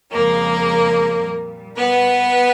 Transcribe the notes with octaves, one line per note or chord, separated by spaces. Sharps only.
F2 C#3 F3 G#3 A#3 A#4
A#2 G3
B3 B4